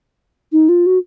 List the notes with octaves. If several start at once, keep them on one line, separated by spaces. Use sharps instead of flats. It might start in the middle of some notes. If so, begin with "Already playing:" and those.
D#4
F4
F#4